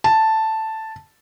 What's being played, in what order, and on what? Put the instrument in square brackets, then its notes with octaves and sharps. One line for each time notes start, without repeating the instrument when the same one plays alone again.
[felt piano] A5